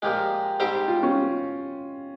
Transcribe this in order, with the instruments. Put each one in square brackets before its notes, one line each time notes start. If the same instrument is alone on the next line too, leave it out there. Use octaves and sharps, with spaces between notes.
[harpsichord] A#2 F3 G#3 [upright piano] G4
[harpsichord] G#2 G3 C4 G4 C5
[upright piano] F4
C#4